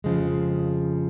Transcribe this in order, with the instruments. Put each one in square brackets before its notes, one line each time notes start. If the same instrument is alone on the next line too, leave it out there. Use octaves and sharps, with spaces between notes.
[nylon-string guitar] F2 C#3 F3 G#3